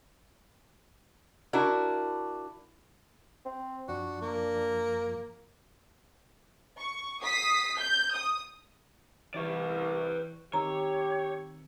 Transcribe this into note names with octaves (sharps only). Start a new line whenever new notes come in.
D4 E4 F#4 A#4
C4
F#2 F3 D4 F#4
A#3
C#6
D#6 B6 C7
G6
D#6
C2 E3 E4 B4 D5 C#6
D#3 C4 G4 C#5 A#5 E6